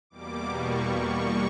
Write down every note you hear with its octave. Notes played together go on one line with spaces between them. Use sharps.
E2 B2 G3 A#3 D6
C#6
C#6